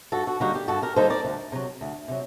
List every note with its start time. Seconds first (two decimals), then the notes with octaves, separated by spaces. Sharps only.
0.12 G2 F#4 A4
0.27 F#4
0.40 D3 G3 A#3 D#4 F#4
0.55 G4
0.68 G2 F#4 A4
0.82 G4 A#4
0.96 D3 G3 A#3 D#4 A4 C5
1.10 A#4 D5
1.25 D2
1.52 C3 F#3
1.81 D2
2.08 C3 F#3